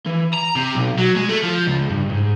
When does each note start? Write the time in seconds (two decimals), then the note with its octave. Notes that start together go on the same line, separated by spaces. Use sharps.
0.06 E3
0.33 A#5
0.56 C3
0.75 B1
0.99 F#3
1.17 G#3
1.29 A3
1.43 F3
1.67 C#2
1.90 G2
2.10 G#2